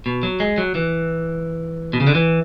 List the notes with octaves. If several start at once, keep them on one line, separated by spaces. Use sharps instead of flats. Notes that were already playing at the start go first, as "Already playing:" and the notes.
B2
F#3
G#3
F#3
E3
B2
C#3
D3
E3